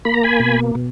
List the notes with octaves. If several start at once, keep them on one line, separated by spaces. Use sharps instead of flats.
A#3 B5
A#5
G#5 B5
B2
B2